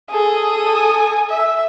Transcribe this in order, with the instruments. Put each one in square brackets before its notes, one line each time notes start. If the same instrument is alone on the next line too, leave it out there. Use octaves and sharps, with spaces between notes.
[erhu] G#4 [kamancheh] A4 D#6
[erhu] G#5
E5